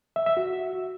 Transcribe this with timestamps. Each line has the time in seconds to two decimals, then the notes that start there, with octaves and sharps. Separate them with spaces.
0.16 E5
0.26 E5
0.37 F#4